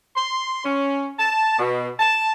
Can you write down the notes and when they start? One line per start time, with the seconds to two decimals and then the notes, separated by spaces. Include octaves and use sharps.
0.16 C6
0.65 C#4
1.19 A5
1.59 B2
1.99 A5